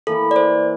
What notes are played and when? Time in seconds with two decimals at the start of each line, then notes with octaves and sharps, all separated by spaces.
0.07 E3 A#3 E4 A4
0.31 D5
0.36 C5